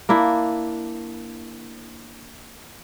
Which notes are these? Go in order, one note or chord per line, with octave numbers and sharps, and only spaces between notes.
A#3 D4 E4